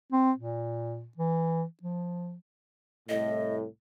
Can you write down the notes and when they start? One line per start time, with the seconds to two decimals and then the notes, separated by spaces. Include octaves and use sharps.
0.12 C4
0.37 A#2
1.17 E3
1.83 F3
3.09 C2 A2 D#5